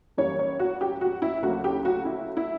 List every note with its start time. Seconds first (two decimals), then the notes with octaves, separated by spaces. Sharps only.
0.17 F#2 E3 G3 A#3 C#5
0.39 C#5
0.59 F#4
0.81 G4
1.01 F#4
1.22 E4
1.42 D2 C#3 F#3 A#3 F#4
1.64 G4
1.85 F#4
2.05 E4
2.37 E4